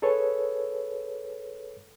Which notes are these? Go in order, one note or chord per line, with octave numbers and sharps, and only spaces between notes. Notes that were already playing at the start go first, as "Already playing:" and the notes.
G#4 A4 B4 C#5